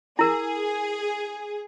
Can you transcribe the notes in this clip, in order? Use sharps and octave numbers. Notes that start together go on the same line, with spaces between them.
E4 G#4 A#4